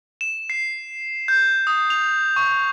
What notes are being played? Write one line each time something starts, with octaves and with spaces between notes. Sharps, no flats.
E7
C7
G6
D#6
F7
C#6